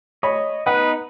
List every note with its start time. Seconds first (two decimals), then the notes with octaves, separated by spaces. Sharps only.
0.23 C#5 D#5 B5
0.66 B3 D#4 B4 D#5 F#5